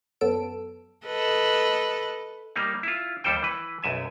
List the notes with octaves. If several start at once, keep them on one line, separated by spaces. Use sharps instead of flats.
F#2 F#3 B3 A4 E6 D7
A4 B4 D#5
G3 A#3 D#4
E4 F4
D#2 G3 A4 C5 G5
E3 B4
B1 F#2 E5 G#5